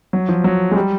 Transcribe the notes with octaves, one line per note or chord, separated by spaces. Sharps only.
F#3
F3
F#3
G#3
G3